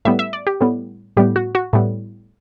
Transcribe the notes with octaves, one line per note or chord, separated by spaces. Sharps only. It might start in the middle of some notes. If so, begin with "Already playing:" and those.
A2 G3 B3 E5
E5
D5
G4
A2 G3 B3
A2 G3 B3 G4
F#4
F#4
A2 G3 B3